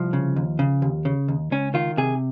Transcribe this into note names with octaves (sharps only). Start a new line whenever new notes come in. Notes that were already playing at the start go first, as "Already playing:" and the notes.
Already playing: C2 F3
C#3
D#2
C#3
D#2
C#3
D#2
C#2 C#4
D#3 F4
C3 G#4